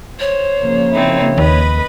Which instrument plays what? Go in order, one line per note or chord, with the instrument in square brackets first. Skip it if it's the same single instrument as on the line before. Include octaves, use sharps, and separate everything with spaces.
[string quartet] C5 [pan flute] C#5
[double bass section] C#3 F3 A#3
[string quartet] C4 D#4 E4
[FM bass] D#2 [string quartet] B4 D#5 B5